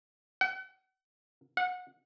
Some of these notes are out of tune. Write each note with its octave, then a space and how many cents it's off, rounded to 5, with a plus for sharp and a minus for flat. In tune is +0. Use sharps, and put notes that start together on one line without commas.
F#5 +40
F#5 -25